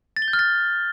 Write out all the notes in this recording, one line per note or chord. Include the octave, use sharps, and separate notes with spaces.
A6
G7
G6
F6
A6